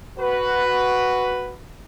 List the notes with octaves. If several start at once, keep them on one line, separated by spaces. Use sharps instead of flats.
F#4 B4